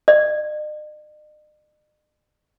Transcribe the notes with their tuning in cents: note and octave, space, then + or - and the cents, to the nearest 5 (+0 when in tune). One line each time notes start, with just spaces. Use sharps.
D#5 -45